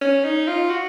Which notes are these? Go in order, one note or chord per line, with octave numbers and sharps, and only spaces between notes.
C#4
D#4
F4
F#4